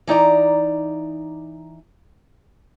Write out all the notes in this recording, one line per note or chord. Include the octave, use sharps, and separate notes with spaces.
E3 D#4 D5 A#5